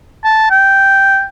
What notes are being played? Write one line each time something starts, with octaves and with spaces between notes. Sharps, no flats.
A5
G5